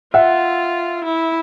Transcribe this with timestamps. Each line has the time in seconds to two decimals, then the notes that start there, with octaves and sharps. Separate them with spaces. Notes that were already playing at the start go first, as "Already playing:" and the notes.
0.14 F4 E5 F#5
1.04 E4